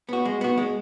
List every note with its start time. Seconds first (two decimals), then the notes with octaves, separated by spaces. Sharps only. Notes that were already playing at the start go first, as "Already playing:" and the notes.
0.09 B3 F#4
0.25 G#3
0.41 B3 F#4
0.57 G#3